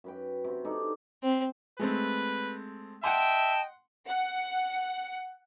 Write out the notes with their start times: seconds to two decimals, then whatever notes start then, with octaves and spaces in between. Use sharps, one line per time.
0.04 F#2 B4 G5
0.44 C3 F#4
0.65 D4 D#4 A4 D5
1.23 C4
1.79 G#3 A3 C4 B4
3.04 D#5 E5 F#5 G5 A5 C6
4.07 F#5